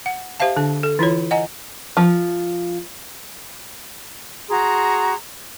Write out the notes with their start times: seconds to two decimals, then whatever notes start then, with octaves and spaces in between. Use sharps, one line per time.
0.06 F#5
0.40 G4 C5 E5 F5 A5
0.57 D3 D4
0.83 A4
0.99 E3 E4 F4 C#5
1.31 D#5 F#5 G#5 A#5
1.97 F3
4.49 F#4 G#4 A#5 C6